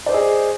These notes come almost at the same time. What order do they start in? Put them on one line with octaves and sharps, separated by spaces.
D5 C5 D#5 G#4